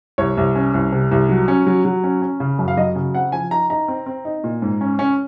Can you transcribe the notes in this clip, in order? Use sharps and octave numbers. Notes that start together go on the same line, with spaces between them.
C2 C#5
C2
C#4
C2
C3
C2
F#3
C#4
F#3
F#3
C#4
C#4
C#3
F#2
F5
F#3 D#5
C#3
C4 F#5
F3 G#5
D#4 A#5
D#4 A#5
C4
C4
D#4
A#2
G#2
C#4
C#4